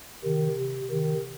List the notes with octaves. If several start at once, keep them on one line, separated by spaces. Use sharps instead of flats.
C3 D#3
C3
C3 D#3